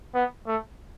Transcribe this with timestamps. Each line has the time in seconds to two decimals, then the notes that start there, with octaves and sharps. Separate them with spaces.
0.14 B3
0.46 A3